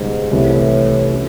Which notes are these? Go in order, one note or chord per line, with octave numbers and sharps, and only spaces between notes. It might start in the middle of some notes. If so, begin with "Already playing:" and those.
Already playing: C#2 G#2 B2 G3
C2 A2 C3 E3 G3
C#4 F4